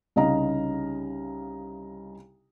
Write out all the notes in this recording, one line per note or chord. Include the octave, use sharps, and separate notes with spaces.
C2 C#3 D#4 D#5 F5 A#5